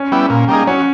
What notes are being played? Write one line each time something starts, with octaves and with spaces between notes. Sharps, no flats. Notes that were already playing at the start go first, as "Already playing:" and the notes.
Already playing: C#4
G3 B3 E4
A#2
G3 A#3 D#4 G#4
F#3 C#4